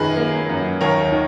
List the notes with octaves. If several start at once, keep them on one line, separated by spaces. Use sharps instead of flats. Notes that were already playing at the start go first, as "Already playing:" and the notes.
Already playing: F#2 D#3 G#4 B4
A#3
F#2
D#2 A#4 C#5
D#3